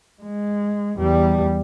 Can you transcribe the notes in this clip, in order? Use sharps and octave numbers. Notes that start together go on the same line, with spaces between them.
G#3
E2 G3